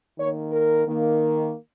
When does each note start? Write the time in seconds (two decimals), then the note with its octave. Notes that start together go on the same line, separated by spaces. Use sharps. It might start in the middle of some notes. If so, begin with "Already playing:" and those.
0.18 D#3 A#3 C#5
0.52 A#4
0.86 D#3 A#3